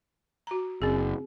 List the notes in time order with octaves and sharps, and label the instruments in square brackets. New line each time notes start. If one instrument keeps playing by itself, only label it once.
[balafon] F#4 A#5
[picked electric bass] F#1 [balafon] C4 G#4